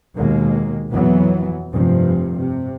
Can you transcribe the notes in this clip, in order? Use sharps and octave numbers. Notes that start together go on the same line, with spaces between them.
D#2 B2 G#3 A#3
F2 B2 E3 F#3 B3
F1 G2 C3 F3
C3